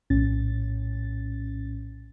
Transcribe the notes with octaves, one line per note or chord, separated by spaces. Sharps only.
A#1 A2 C#4 A6